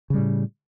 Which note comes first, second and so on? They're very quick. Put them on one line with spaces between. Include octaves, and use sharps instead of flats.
C#3 G3 A2